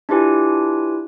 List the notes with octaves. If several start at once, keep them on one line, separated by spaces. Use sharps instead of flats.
D4 E4 F4 G4 B4 G#5